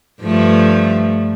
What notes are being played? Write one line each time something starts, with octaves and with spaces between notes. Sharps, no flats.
G2 F3 A3